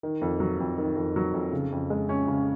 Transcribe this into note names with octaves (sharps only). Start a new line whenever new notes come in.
D#3
F2
F#3
F2
D#3
F2
F#3
F2
C#3
F2
G#3
C#4
C#3